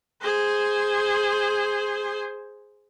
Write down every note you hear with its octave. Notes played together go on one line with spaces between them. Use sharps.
G#4 C5